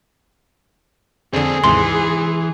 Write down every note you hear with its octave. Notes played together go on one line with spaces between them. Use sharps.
F2 D3 C4 D4 G#4
D#2 G#2 C3 E3 C6